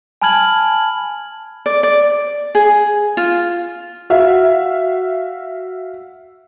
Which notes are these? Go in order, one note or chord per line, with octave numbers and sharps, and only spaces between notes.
G#5 A5 B5 F6 G#6 F#7
D5
D5
G#4
F4
F#4 E5 F5